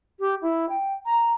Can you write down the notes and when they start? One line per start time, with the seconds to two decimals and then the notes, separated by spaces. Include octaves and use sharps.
0.19 G4
0.42 E4
0.69 G5
1.06 A#5